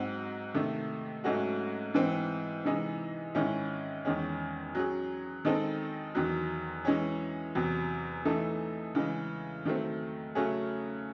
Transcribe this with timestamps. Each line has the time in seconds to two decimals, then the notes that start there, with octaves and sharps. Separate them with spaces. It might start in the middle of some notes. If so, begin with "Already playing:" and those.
Already playing: G#2 F#3 C4 F#4
0.54 C3 D#3 A3
1.24 G#2 F#3 A3 C#4 F#4
1.94 G#2 E3 C4
2.64 C3 E3 G#3 D#4
3.35 G#2 D#3 G#3 C#4 E4
4.05 E2 D#3 G#3 C#4
4.75 F#3 C#4 G#4
5.45 D#3 G#3 C4 D#4 A4
6.15 E2 D#3 F#3
6.85 E3 G#3 C#4
7.55 E2 C3 F#3
8.25 E3 A3 D#4 A4
8.95 C#3 E3 G#3
9.65 D#3 F#3 A3 C4
10.35 C#3 F#3 A3 C#4 G#4